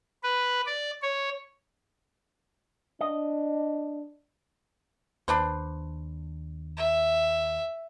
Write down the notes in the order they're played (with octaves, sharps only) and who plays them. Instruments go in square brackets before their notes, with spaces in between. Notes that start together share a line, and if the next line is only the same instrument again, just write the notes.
[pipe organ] B4
D5
C#5
[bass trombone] D4 [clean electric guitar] D#5
[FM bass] D#2 [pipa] D4 B4 C5
[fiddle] E5